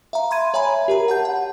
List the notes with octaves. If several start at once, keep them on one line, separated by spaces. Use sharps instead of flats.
E5 F5 A#5
B5 C6 G#6 D#7
C#5 E5 G#5 A#5 B5
G4 A#4 A#5
F#5 A5 G6
F#5